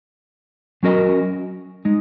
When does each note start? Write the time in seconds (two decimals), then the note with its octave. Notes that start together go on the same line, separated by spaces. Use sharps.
0.83 F#3 C#4 F#4 A#4 D#5
1.85 G#3 D#4